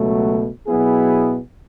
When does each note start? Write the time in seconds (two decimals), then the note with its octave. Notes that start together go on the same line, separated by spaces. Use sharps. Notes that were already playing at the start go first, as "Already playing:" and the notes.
Already playing: C#2 B2 F#3 A3
0.67 B2 F#3 B3 E4 G#4